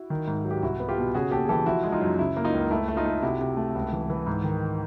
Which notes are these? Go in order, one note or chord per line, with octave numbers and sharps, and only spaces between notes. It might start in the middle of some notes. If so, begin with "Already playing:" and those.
Already playing: E4 F#4
D#3
G#2
F#3
G4
C2 E4 F#4
B3
F4 G4
B2
C#3 F#4 G#4
D#2 G4 A4
G#4
E3 G4 A4
F3 E4 F#4
G#3
D#4 F4
F#2
C#3 E4
A#3
D#4 F4
C#2
A3 E4
A3
D#4 F4
A3
C3 E4 F#4
C3
A3
C#2
E3
E3
G#2
D#3